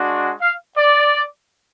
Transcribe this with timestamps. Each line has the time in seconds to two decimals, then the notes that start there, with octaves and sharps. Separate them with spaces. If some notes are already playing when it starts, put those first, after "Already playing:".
Already playing: G#3 D4 F#4
0.41 F5
0.78 D5